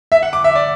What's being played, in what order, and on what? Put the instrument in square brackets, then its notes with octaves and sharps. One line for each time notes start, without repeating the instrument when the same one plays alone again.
[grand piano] E5
F#5
D6
E5
D5